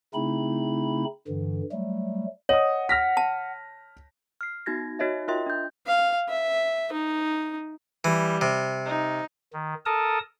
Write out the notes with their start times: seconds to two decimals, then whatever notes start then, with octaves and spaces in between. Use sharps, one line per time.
0.14 C#3 A3 C4 D#4 E4 B5
1.28 G2 D3 E3
1.72 F#3 G3 A3
2.49 C#5 D#5 F#5 D#6
2.89 F6 A#6 B6
3.17 A5
4.41 F6 C7
4.66 B3 D#4 F#4 G#6 A#6
4.99 D#4 F#4 C#5 D#5 E5
5.28 F4 A#4 D#5 E5 G5 C6
5.46 D4 G6
5.87 F5
6.29 E5
6.92 D#4
8.04 E3 G3
8.41 C3
8.85 D#4
9.53 D#3
9.86 A4 A#4 A5 D#6